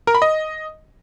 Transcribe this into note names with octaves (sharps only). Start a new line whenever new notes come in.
A#4
B5
D#5